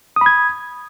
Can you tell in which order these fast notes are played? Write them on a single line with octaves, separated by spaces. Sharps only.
D#6 B5 G#6